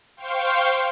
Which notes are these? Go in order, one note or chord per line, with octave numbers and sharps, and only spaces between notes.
C5 F5 G5 C6 C#6